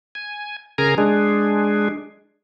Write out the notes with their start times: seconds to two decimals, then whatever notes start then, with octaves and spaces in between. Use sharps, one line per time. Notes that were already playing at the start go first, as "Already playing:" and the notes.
0.15 G#5
0.78 C#3 G#4 A#4 G#5 A#5
0.98 G#3 D4 G#4